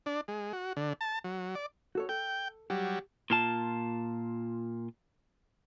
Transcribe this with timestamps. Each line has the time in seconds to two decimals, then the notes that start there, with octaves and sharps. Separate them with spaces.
0.06 D4
0.28 G#3
0.53 F#4
0.77 D3
1.01 A5
1.24 F#3
1.55 D5
1.95 F#4 A4 C#5
2.09 A4 G5
2.70 F#3 G3 G4
3.30 A#2 F4 A5